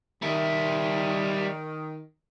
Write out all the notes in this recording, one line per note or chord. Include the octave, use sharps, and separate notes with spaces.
D#3 G3 E5